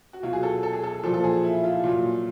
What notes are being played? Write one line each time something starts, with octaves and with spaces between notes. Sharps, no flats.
F#4
B2 F#3 F4
G#4
A4
A4
G#4
A4
A#2 F3 A4
A4
G#4
E4
F4
A#2 F#3